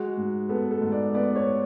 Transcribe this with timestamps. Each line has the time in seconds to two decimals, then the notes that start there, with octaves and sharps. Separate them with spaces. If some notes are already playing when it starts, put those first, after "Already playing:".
Already playing: G#3 F#4
0.17 G#2
0.49 B3 A4
0.71 A4
0.81 G#2
0.92 D5
1.14 B3 D5
1.36 C#5